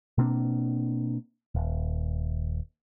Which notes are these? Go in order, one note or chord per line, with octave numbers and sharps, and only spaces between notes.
B2 A#3 C4 D4
D#1